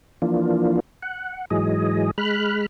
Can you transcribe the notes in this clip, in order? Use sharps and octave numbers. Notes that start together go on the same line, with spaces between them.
E3 F3 A#3 D4 F4
F#5
G#2 E3 F#3 G#4 D#5
G#3 B5 F6 F#6